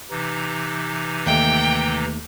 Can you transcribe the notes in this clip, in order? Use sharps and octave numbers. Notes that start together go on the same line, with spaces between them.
C3 E3 D#4
D#2 A3 G5